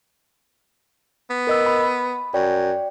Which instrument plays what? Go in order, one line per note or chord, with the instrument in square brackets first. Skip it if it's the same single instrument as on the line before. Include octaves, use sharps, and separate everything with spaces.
[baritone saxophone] B3
[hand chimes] A#4 D#5 E6
B5
[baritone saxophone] F#2 [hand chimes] D5 G5